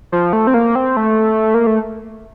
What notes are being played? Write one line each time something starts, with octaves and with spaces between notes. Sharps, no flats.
F3
A3
C4
A#3
C4
A3
A#3
A3